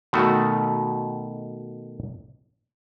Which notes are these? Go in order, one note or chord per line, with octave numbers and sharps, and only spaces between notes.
B2 D#3 A3 F#4